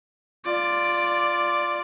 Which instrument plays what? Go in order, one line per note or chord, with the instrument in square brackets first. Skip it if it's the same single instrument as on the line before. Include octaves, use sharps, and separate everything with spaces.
[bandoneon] F4 [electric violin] D5